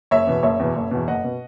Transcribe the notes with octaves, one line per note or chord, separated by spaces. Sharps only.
F#1 C#5 E5
E2 B2
F#1 C#5 E5
E2 B2
F#1
E2 B2
F#1 D#5 F#5
B2